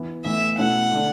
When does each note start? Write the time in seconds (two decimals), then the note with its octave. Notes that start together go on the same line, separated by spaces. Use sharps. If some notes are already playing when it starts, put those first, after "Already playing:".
Already playing: E3 B3 E4
0.25 A2 E3 B3 E5
0.58 B2 A3 C#4 E4 F#5
0.91 D3 A3 D4